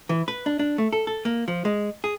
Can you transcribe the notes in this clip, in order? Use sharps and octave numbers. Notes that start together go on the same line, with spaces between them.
E3
B4
D4
D4
A3
A4
A4
A#3
F3
G#3
G#4